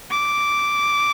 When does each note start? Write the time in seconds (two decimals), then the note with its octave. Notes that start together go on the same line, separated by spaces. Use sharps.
0.11 D6